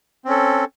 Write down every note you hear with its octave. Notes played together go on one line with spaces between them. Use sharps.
C4 C#4 A4